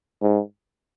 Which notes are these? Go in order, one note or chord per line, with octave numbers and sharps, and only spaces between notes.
G#2